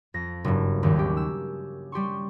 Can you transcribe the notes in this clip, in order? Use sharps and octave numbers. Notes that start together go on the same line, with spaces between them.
F2 A#6
F#1 G2
G#1 D#2 D#3
C#4 G4
E6
G3 G4 C6 C#6